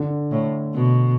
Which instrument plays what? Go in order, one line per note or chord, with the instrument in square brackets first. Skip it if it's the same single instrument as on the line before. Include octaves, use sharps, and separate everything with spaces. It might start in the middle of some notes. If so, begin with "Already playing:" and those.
Already playing: [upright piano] D3
[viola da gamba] A2
B2